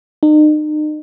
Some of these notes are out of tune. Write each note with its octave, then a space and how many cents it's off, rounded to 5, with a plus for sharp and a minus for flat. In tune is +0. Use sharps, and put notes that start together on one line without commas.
D#4 -40